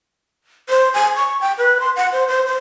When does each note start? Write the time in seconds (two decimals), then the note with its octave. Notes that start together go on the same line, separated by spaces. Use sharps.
0.69 C5
0.94 G#5
1.16 C#6
1.41 G5
1.58 B4
1.80 C6
1.96 F#5
2.12 C5
2.28 C5
2.46 C5